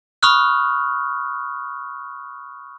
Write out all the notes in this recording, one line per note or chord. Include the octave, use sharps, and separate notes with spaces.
B5 C#6 D#6 F6 F#6